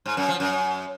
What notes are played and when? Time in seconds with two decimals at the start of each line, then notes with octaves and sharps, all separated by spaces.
0.06 G#2
0.17 F#2
0.29 F3
0.40 F#2